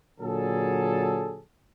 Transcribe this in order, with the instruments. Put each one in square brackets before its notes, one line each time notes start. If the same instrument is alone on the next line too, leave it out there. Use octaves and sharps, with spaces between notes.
[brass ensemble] A#2 D3 F#3 G#4 A4